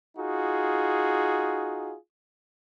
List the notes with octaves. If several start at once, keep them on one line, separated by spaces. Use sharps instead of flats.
D#4 F4 F#4 G#4